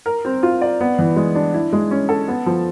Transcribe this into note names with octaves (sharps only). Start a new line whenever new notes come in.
A#4
C4
F4
D5
B3
E3
G#3
D4
E4
G#3
C#4
A4
B3
F3